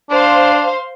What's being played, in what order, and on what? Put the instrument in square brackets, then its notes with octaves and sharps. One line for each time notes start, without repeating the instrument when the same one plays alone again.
[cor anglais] D4 [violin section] C5 F5 C6